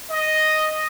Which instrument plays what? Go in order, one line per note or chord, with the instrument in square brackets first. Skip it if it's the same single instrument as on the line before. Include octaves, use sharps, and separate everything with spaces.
[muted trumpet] D#5